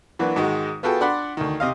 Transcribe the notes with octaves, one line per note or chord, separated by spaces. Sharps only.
E3 F#3 A#3 D4 F#4 B4
G#2 D#3 G#3 F#4
B3 F4 F#4 G#4 A4 G5
D4 D5 F#5 B5 C6
D2 D#3
C3 D#5 F5